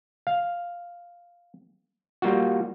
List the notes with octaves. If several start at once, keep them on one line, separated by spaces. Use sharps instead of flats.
F5
G3 A#3 F4 F#4